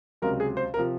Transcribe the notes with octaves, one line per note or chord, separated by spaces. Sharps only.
C#2 C3 F#3 A#4
G#4
C5
A#4
C3 F3